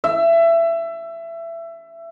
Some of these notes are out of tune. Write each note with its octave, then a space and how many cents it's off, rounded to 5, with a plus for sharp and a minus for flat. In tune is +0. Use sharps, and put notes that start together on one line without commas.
E5 +20